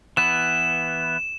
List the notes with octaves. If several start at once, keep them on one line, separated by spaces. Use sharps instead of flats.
E3 B3 B4 E7